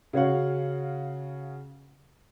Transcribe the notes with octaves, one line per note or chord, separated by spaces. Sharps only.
C#3 F#4 C#5 F5 F#5